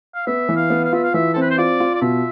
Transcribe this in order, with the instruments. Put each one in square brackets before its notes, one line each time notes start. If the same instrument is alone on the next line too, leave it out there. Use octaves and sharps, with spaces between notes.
[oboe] F5
[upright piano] B3 [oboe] E5
[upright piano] E3
[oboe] F5
[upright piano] B3
[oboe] F5
[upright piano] F4 [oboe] E5
[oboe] F5
[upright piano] E3 [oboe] E5
[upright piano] C4 [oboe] A4
[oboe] B4
C5
[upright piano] F4 [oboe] D5
[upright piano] F4
[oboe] D5
[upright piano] B2 [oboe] E5